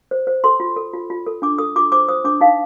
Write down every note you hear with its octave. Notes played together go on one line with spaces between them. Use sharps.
C5
C5
A4 C6
F4
A4
F4
F4
A4
D4 D6
A4 D#6
F4 D6
C5 D6
C5 D#6
D4 D6
D#4 F5